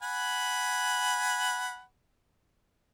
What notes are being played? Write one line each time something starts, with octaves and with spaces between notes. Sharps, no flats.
F#5 G#5 B5